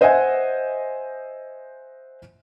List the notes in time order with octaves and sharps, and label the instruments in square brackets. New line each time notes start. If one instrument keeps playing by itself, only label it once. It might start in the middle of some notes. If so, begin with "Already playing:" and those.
[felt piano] C5 D#5 E5 F#5 G#5